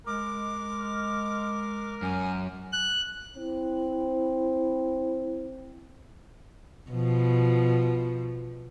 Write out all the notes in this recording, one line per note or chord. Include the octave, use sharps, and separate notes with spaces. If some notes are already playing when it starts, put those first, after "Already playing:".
G#3 A#4 D6
F#2 G#5
F#6
C4 E4
B2 F3